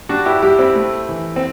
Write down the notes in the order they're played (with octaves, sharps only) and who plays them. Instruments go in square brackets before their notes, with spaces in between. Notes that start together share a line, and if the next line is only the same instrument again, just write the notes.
[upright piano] G3 D4 F#4
E4 G4
G3 E4 G4
C4 E4
A3
E3
C4